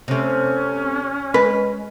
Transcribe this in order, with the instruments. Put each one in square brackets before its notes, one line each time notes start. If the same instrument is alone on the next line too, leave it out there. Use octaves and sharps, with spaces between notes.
[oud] C3 A3 [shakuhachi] C#4
[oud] G#3 [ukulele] B4